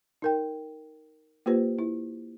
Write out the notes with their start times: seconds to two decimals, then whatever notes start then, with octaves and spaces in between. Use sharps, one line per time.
0.22 D#4 A#4 G5
1.46 A#3 F4 G4 B4 C5
1.79 E4